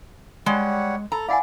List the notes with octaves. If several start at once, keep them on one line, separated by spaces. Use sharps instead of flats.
G3 G#3 C#5 F#5
A4 A#5
E4 D5 F5 F#5 G#5